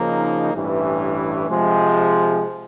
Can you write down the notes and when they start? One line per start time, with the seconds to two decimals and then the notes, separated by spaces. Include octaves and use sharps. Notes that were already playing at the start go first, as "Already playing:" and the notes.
Already playing: C#3 F3 A#3 D#4
0.52 A1 G2 E3
1.48 C3 F3 G#3